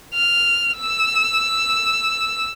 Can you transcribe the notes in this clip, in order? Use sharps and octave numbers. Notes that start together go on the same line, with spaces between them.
F6
E6